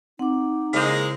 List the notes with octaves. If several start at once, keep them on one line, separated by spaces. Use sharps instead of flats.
C4 D#4 F#5 D6
C#3 G#3 A#3 E4 C5 G6